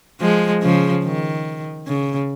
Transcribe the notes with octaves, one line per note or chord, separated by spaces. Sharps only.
F3 G#3
C#3 F3
D#3
C#3